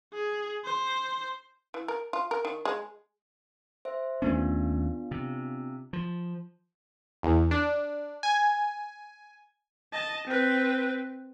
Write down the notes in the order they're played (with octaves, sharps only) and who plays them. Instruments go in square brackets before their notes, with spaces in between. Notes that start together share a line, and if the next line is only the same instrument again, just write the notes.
[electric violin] G#4
C5
[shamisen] E3
A#4
F4
A#4
D#3
G#3
[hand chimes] C5 E5
[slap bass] D#2 A3 C#4 [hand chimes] B3 D4 F4
[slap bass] C3
F3
[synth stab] E2
D4
G#5
[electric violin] D#5 A5
C4 B4